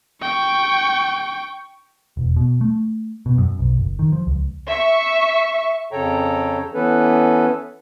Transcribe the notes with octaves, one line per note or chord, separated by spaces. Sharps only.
G5 C#6
E1
B2
A3
B2
F#2
B1
F#1
D#3
F3
C#2
E5 C#6
F2 C#3 A4 C#5 G5 A#5
E3 B3 C#4 A4 B4